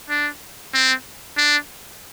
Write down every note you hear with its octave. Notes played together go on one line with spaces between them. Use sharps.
D4
C4
D4